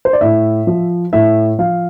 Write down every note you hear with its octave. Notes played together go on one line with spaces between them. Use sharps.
C5
D5
A2 E5
F3
A2 E5
F3 F5